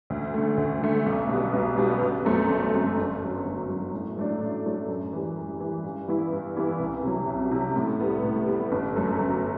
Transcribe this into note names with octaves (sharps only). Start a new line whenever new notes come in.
D2
D3 A3
D2
D3 A3
B1
B2 G3 B3
B1
B2 G3 B3
G1
F#2 F#3 A3 C4
G1
F#2 F#3 A3 C4
G1
F#2 F#3
G1
F#2 F#3
A2
F#3 A3 D4
A2
F#3 A3 D4
F#2
E3 G3
F#2
E3 G3
G2
E3 G3 B3 E4
G2
E3 G3 B3 E4
C2
C3 F#3
C2
C3 F#3
A2
G3 B3
A2
G3 B3
G1
F#2 F#3 A3
G1